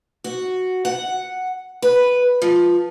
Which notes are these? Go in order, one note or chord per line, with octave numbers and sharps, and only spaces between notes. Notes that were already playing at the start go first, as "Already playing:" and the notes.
F#4
F#5
B4
F3